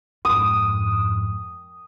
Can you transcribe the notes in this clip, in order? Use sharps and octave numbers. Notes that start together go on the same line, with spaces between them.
F2 G#2 D#6